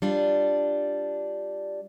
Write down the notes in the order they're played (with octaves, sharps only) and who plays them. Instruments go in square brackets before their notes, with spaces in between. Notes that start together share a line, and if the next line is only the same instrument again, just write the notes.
[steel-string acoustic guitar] G3 D4 F4